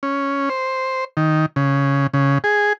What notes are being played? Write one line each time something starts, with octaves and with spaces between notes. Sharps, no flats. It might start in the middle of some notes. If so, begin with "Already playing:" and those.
C#4
C5
D#3
C#3
C#3
G#4